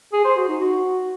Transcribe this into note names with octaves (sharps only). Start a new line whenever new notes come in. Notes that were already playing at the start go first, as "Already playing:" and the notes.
G#4
C5
F#4
D#4
F#4